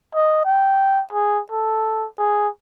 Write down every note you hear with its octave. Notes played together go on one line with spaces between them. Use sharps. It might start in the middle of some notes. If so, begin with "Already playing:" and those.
D#5
G5
G#4
A4
G#4